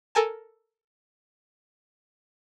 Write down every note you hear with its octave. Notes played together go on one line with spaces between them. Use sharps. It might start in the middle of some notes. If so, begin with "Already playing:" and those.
A4 A#4 G#5 A5